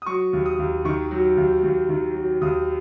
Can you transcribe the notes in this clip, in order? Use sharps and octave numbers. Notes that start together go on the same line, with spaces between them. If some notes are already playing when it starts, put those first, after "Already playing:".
D#6
F#3 C#6
D#2
D#6
D#2
D#3 C#6
F#3
D#2
D#2
D#3
F#3
D#2 D#6